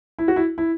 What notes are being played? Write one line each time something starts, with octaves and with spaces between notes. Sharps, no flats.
E4
F#4
E4
E4